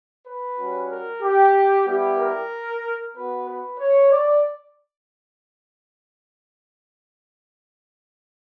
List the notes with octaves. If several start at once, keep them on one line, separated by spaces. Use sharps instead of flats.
B4
G3 C#4 F#4
A#4
G4
G3 B3 E4 G4
A#4
B3 F#4 B4
B4
C#5
D5